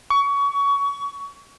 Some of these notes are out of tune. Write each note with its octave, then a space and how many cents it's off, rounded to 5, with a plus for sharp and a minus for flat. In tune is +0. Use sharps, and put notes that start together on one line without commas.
C#6 +25